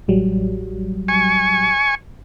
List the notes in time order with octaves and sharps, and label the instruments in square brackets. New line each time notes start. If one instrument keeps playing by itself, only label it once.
[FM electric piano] A1 F#3 G3
[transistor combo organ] G#5 C#6